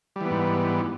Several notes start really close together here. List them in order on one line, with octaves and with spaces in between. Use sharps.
G3 E3 B3 G#2